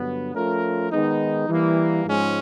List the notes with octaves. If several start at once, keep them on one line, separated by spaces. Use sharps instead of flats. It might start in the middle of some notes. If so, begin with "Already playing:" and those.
Already playing: G2 D3 F#3 B3
F3 A3 C#4 F4 A#4
D#3 G#3 B3 D#4
E3 G3 A#3
G#2 F3 G#3 C#4